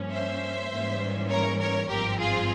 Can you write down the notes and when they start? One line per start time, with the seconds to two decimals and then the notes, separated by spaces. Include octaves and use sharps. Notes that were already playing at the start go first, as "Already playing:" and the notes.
Already playing: G2 F3 A#3 C#4
0.11 C5 E5
0.71 G#2 E3 G3 A#3 C#4
1.30 A#4 C#5
1.59 A#4 C#5
1.89 G#1 G2 F3 C4 G4 A#4
2.19 F4 G#4